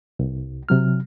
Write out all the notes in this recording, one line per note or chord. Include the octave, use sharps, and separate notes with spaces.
C2
C3 F#3 F6